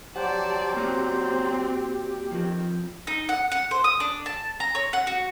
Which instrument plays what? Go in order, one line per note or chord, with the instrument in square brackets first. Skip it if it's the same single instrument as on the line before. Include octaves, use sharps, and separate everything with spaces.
[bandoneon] F#3 C5 [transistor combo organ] G4 [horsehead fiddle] D5 A5 [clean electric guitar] F#5
[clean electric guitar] A#3 F#4 D5 [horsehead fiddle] C4
[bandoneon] D#3 [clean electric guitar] F3 C4
[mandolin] D#4
F#5
F#5
C5
D#6
D4
A5
A#5
C#5
F#5
F#4